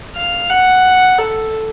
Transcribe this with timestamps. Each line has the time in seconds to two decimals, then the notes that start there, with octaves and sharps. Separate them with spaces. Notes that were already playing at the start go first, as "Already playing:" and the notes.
0.15 F5
0.50 F#5
1.18 A4